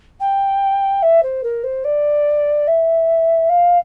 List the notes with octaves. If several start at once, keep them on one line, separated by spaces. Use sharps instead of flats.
G5
E5
C5
A#4
C5
D5
E5
F5